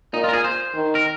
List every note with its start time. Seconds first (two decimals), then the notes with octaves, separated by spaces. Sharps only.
0.13 A#2 D#4
0.24 F4
0.29 A#4
0.33 G#4
0.44 C5
0.75 D#3
0.95 A#4